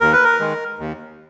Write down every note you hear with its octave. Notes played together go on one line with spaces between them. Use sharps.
D#2 A#4
B4
A#4
D#3 G#3
D#2